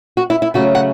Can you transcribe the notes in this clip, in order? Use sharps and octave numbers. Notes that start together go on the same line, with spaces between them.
F#4
E4
E4
C#3 F#3 A3 C#4 F#4
F#5